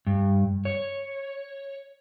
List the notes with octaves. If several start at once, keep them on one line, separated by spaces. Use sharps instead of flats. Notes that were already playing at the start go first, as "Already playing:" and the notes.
G2
C#5